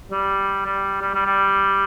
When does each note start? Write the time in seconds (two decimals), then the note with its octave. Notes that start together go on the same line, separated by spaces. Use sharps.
0.11 G3
0.65 G3
1.02 G3
1.14 G3
1.26 G3